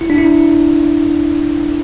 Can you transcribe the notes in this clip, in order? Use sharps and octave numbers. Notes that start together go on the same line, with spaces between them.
E4
D4
E4